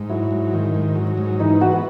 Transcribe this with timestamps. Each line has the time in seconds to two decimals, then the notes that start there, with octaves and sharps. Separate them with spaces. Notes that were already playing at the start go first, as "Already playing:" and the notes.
Already playing: G#2
0.10 F#3 E4
0.31 G#2
0.53 D#3
0.74 G#2
0.96 F#3
1.18 G#2
1.40 E3 D#4
1.61 B3 F#4
1.73 F#4